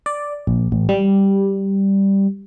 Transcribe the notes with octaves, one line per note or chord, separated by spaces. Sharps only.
D5
A#1
A1
G3